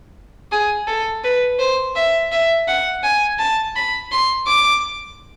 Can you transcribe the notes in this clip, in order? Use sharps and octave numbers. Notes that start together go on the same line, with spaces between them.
G#4
A4
B4
C5
E5
E5
F#5
G#5
A5
B5
C6
D6